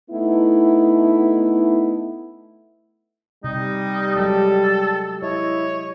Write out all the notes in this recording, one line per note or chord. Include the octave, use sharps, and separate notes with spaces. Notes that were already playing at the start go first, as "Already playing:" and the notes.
A3 B3 D#4 E4
C3 G3 D#4
F#3 G#3 G4 A4
E4 C#5 D#5